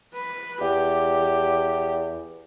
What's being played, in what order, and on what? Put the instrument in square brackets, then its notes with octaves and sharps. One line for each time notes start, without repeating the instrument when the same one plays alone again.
[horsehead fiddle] B4
[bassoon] E2 [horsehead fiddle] G4